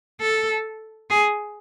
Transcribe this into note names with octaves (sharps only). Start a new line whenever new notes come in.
A4
G#4